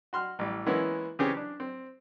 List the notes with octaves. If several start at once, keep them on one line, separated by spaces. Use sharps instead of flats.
F#4 C6 F6
A1 G3
E3 G#3 A#3 B3 C#4 E4
C#3 E3 C4 C#4 G4 G#4
D4
C4